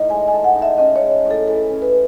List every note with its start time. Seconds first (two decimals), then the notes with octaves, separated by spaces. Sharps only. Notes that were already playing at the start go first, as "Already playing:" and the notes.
Already playing: A2 D#4
0.10 G#3 G#5
0.28 G#5
0.33 A4
0.44 F#5
0.56 D#4
0.62 E5
0.78 C#4 D#5
0.96 C#5
1.02 G#3
1.25 A2
1.31 A4
1.47 E3 A4
1.70 C#4
1.82 B4